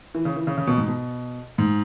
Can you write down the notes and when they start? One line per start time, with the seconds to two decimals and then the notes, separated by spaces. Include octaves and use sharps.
0.15 E3
0.25 C#3
0.36 E3
0.47 C#3
0.58 C#3
0.67 B2
0.77 G#2
0.88 B2
1.58 G#2